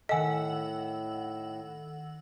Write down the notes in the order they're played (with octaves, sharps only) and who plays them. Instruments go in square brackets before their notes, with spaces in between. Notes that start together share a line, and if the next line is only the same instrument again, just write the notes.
[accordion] A2 [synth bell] D#3 F#5 E6 [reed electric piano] A4 [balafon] D#5 G#5